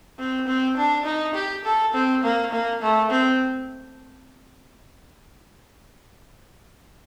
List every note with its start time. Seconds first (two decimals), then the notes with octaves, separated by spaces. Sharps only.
0.19 C4
0.48 C4
0.77 D4
1.05 D#4
1.35 G4
1.64 A4
1.94 C4
2.24 A#3
2.52 A#3
2.82 A3
3.10 C4